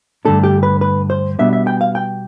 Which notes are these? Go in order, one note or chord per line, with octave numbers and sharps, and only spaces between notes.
G2 D3 A3 D4 A4
G4
B4
B4
C5
B2 G3 B3 D4 E5
E5
G5
F5
G5